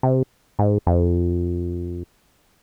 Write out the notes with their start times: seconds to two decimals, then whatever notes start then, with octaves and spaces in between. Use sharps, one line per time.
0.03 C3
0.59 G#2
0.87 F2